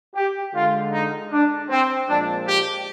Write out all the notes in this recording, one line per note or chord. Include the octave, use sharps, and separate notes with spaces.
G4
D3 G#3 F4
D#4
D4
C4
A#2 F3 G#3 D4
G4